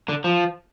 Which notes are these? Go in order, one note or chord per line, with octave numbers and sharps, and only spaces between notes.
D3
F3